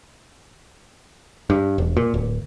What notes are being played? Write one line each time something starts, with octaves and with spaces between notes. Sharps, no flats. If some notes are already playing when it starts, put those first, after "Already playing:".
G2
E1
A#2
D1